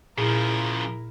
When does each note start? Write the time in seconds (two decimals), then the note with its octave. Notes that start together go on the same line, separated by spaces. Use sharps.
0.18 A#2 C#3 F3 E4 A#4